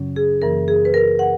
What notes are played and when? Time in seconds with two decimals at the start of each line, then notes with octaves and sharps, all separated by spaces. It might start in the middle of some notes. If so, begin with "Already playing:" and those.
Already playing: F#2 C#3 F#3 C#4
0.16 G#4
0.42 F#2 E3 A#3 A#4
0.68 G#4
0.85 B4
0.94 A#4
1.19 F#5